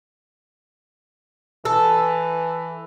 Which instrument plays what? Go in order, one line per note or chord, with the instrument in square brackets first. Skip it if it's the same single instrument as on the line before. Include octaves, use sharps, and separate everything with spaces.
[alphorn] E3 [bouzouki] A4